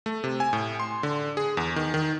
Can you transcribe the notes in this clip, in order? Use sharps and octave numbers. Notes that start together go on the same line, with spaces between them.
A3
C3
G#5
A2
C6
D3
G#4
E2
D#3
D#3